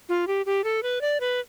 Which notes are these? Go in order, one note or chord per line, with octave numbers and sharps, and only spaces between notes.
F4
G4
G4
A4
B4
D5
B4